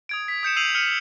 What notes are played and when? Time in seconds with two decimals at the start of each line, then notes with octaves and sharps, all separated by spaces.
0.09 D#6 G#6 D7
0.28 B6
0.43 D#6 G6 C#7 E7
0.56 E6 C7 D#7 F7 F#7
0.75 F6 C#7 D#7